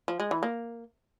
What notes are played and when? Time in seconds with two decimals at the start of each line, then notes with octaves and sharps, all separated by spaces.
0.08 F3
0.20 G#3
0.31 E3
0.43 A#3